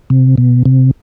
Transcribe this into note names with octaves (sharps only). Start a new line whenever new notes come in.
C3
B2
C3